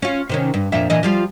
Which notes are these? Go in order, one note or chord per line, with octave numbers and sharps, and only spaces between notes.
C#4 F4
C3 D#3 C#4
G2
F2 A#2 E5
A#2 E3 D#5
F3 G3 F4